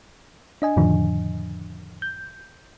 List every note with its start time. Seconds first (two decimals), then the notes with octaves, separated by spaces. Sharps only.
0.62 D4 D#5 G#5
0.76 F2 A2 D3 D#3 F3 D4
2.02 G6